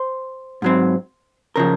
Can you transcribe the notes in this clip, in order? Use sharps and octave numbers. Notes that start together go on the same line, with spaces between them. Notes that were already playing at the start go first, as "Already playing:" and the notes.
Already playing: C5
G#2 F#3 C4
C#3 F3 A#4